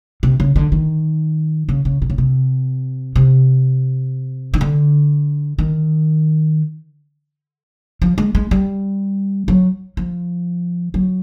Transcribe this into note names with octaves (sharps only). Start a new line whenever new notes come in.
C3
C#3
D3
D#3
C#3
C#3
C3
C#3
C3
C3
D#3
D3
D#3
F3
G#3
G#3
G3
F#3
F3
F#3